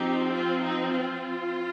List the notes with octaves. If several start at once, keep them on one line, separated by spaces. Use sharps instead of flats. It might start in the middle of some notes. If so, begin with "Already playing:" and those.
Already playing: F3 C4 D#4 G4
F4
D#4
F4